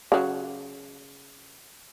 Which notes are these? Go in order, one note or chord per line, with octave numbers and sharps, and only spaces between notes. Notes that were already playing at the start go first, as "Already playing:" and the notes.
C#3 F#3